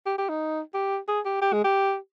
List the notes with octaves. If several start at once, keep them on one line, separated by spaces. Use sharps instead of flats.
G4
G4
D#4
G4
G#4
G4
G4
G#3
G4